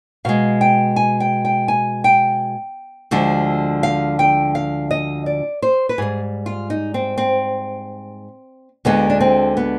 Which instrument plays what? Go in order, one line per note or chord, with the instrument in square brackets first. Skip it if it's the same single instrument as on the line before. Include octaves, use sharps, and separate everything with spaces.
[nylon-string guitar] B2 G#3 F5
G5
G#5
G5
G5
G#5
G5
D2 D3 F3 G#3
F5
G5
F5
D#5
D5
C5
B4
G#2 G3 G#4
F4
D#4
C4
C4
D2 D3 G#3 B3
D4
C4
B3